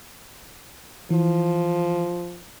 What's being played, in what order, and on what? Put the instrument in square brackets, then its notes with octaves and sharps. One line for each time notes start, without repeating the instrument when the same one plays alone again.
[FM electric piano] E3 [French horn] F3